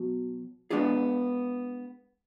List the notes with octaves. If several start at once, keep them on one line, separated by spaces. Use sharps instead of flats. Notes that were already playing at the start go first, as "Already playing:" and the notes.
Already playing: B2 F#3
G#3 B3 D4 F4 G#4